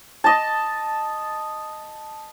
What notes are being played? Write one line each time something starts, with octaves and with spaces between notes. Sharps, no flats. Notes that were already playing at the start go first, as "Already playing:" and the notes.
D#5 A5